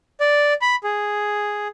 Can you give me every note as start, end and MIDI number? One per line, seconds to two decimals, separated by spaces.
0.21 0.53 74
0.62 0.76 83
0.84 1.68 68